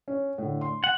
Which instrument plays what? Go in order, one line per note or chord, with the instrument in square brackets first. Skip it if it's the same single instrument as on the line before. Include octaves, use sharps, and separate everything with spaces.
[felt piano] C#4
A2 D3
C6
[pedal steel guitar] F#5